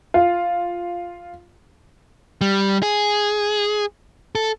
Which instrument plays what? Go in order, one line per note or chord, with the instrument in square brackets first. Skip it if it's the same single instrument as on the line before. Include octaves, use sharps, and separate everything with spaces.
[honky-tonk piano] F4
[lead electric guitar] G3
G#4
A4